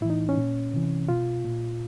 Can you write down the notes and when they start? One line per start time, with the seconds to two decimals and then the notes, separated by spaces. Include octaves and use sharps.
0.01 A2 E4
0.05 E3
0.10 D#4
0.29 C#4
0.37 A#2
0.74 C3 E3
1.09 B2 F4
1.45 A#2